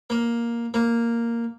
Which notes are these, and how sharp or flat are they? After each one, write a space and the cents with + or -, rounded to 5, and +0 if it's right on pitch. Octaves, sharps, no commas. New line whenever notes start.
A#3 +5
A#3 -5